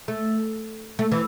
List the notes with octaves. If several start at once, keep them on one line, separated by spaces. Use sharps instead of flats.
A3
A3
E3